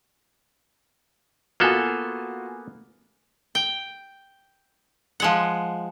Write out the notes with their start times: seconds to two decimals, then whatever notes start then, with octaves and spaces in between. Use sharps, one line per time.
1.60 A#3 B3 F4 F#4 A4 G#5
3.55 G5
5.20 F3 G#3 F#5